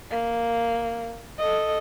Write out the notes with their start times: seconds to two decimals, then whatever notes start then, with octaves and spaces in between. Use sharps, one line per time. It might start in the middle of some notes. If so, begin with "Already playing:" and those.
0.11 A#3
1.39 A4 D#5